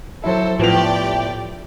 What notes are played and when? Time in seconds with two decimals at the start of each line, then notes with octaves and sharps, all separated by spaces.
0.24 F#3 E4 A4 C5
0.59 A2 F3 B3 G4 D5 G5 F7